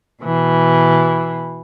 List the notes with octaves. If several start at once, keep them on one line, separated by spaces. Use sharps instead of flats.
B2 E3